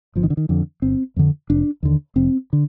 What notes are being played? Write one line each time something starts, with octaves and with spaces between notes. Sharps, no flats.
G1 F3
D#3
D3
D#3
F2 D3
G1 C4
F2 D3
F1 D4
D#2 D3
F1 C4
D3